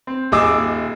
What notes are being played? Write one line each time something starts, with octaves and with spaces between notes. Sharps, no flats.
C4
D#1 G#4 D#5 D6 E6